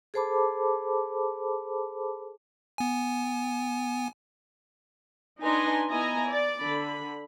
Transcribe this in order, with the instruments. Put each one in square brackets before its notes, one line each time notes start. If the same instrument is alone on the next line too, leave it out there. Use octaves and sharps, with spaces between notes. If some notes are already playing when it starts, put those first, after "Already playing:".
[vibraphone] G#4 A4 C5 A5 B5 D6
[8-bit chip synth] B3 G#5
[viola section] D4 D#4 B4 G#5 A#5 C6
B3 E4 D#5 G#5 A#5
D5
D3 B5